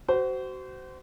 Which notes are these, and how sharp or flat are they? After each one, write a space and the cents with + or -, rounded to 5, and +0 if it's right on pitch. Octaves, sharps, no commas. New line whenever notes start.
F#4 +30 C5 -20